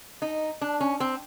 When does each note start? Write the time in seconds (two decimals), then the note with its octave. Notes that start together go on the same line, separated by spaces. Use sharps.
0.22 D#4
0.61 D4
0.80 C#4
1.00 C4